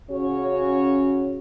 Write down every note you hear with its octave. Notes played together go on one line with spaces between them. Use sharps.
C#3 C#4 F#4 C#5